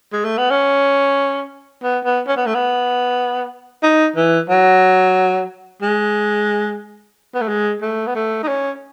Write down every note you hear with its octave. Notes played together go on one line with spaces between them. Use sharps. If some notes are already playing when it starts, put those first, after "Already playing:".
G#3
A3
B3
C#4
B3
B3
C#4
B3
A3
B3
D#4
E3
F#3
G#3
B3
A3
G#3
A3
B3
A3
D#4
C#4